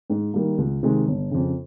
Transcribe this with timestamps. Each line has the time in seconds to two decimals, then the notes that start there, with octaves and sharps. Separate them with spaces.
0.10 G#2
0.34 D#3 G3 A#3
0.58 C#2
0.83 C3 D#3 G#3
1.07 G1
1.31 F2 C#3